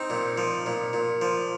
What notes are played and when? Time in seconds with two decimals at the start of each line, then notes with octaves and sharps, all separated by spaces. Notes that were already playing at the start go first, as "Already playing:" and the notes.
Already playing: C4 D#4
0.10 A#2
0.38 F3
0.66 A#2
0.93 A#2
1.21 F3